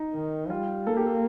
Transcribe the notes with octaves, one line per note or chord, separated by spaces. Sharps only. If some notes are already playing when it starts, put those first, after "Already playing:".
Already playing: D#4
D#3
G3 F4
A#3 A4
G4
A4